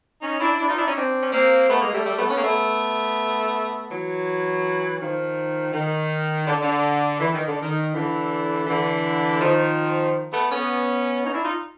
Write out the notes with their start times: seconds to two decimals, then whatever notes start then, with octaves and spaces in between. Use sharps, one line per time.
0.22 C#4 D#4
0.40 D4 E4
0.59 D4 E4
0.67 D#4 F4
0.77 D4 E4
0.86 C#4 D#4
0.96 C4 D4
1.23 C#4
1.32 A#3 C4
1.68 A3 B3
1.81 G#3 A#3
1.93 G3 A3
2.05 G3 A3
2.18 A3 B3
2.30 B3 C#4
2.37 A#3
2.43 A3 B3
3.89 E3 F#3
5.00 D#3 F3
5.73 D#3
6.47 D3
6.61 D3
7.20 E3
7.34 D#3
7.47 D3
7.62 D#3
7.94 D3 E3
8.67 D3 E3
9.40 D#3 F3
10.33 A3 B3
10.51 B3 C#4
11.24 C#4 D#4
11.34 D4 E4
11.43 D#4 F4